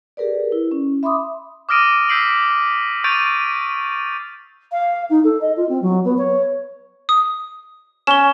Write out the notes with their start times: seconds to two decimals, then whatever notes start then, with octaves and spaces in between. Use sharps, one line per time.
0.17 G4 G#4 A#4 B4 D5
0.52 E4
0.71 C#4
1.03 E5 B5 C6 D6 D#6
1.69 D6 D#6 F6 A#6 D7 D#7
2.09 E6 G6 B6 C7 D7 F#7
3.04 C#6 G6 A6 D7 D#7 F7
4.72 F5
5.10 D#4
5.24 A4
5.41 D#5
5.57 F4
5.69 C4
5.82 F#3
6.04 B3
6.18 C#5
7.09 D#6
8.07 C#4 E7 G7